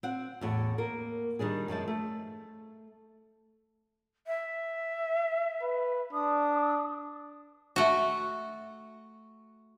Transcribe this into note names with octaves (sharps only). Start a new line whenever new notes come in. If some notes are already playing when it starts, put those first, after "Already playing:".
C4 F#5
E2 A2 F#5
A#3 A#4
D#3 G3 D4 G#4
F#2 F3 G#3 A5
A3
E5
B4
D4 D#6
A3 F#4